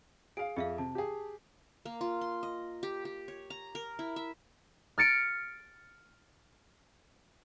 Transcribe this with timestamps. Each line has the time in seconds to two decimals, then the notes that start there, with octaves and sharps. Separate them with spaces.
0.37 G#4 F5 D7
0.57 F2 G#4 E5 F5
0.78 C3 A5
0.95 G4 G#4
1.85 A#3
2.01 F4
2.21 C6
2.43 D#5
2.83 G4
3.05 G4
3.28 C#5
3.50 A#5
3.75 A#4
3.99 E4
4.16 E5
4.98 F6 A6 C#7 D7